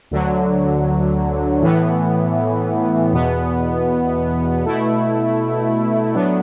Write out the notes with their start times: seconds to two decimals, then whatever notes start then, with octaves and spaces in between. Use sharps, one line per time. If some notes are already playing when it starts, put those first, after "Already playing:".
0.11 D2 D3 F#3
1.62 A2 E3 B3
3.13 E2 B2 B3
4.65 B2 A3 E4
6.14 A2 F#3 B3 D4